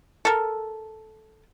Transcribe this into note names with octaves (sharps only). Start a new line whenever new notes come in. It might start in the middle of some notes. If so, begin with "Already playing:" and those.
A4 A#4